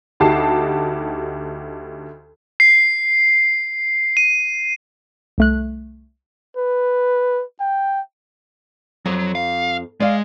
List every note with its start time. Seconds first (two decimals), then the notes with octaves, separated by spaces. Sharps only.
0.20 D2 D#4 F#4 G4 A5 C7
2.60 C7
4.17 D#7
5.38 C2 A3 F#6
6.57 B4
7.60 G5
9.06 F2 F#3
9.35 F5
10.00 G#3 D5 F5